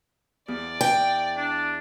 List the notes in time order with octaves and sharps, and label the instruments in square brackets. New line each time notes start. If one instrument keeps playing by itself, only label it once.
[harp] E2 [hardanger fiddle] D5
[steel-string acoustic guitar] G5
[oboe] D4